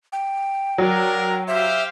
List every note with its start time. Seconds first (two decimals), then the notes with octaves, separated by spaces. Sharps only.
0.13 G5
0.78 F#3 D4 A#4
1.47 G4 C5 E5 F5